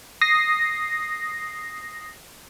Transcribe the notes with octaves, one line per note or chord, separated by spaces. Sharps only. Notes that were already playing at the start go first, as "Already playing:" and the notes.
D#6 A#6 C7